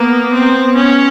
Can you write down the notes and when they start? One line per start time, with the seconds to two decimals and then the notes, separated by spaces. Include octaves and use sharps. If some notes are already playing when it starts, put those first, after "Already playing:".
Already playing: A#3 B3
0.33 C4
0.75 C#4